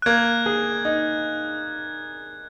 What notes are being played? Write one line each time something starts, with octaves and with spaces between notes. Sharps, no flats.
F#6
A#3 G#6
G#4
D#4